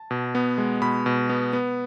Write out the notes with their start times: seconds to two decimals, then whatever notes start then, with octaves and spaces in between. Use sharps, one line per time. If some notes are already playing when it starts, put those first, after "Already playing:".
Already playing: A5
0.11 B2
0.35 B3
0.58 G#3
0.82 B2 B5
1.06 B2
1.29 B3
1.53 B3